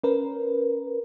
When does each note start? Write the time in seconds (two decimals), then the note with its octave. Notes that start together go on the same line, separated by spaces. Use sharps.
0.03 C#4 A#4 B4